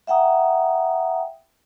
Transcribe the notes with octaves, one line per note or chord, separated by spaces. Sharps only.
E5 F#5 G5 A#5 D#6